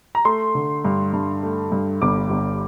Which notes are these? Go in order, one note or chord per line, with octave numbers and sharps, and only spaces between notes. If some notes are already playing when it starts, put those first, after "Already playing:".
A#5
A3 C6
D3
G2
G2
A3
G2
G1 D6
G1